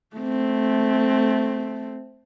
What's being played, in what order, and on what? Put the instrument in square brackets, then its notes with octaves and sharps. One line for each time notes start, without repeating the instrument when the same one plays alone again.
[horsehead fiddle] A3 C4